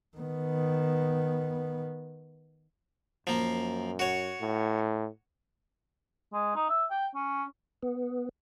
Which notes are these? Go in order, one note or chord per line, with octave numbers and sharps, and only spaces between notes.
D#3 B3
F#2 F3 A#3
F#4 C#5
A2
G#3
D#4
E5
G5
C#4
B3